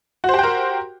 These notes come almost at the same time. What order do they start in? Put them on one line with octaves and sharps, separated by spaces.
F#4 C5 G4 G5 A#4